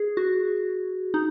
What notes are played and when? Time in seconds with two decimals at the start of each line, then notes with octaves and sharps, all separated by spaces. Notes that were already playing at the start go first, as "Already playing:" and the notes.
Already playing: G#4
0.17 F#4
1.14 D#4